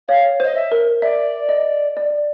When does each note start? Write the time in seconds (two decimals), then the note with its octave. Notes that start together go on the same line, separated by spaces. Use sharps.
0.08 C#5 F5
0.40 C5 D#5
0.55 E5
0.72 A#4
1.02 D5 E5
1.49 D#5
1.97 D5